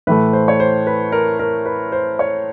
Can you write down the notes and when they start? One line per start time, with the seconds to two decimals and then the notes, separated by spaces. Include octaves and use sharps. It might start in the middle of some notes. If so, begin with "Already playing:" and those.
0.07 A2 E3 A3 B4
0.33 C5
0.48 C#5
0.60 C5
0.87 B4
1.12 A#4
1.39 A#4
1.66 B4
1.92 C5
2.19 C#5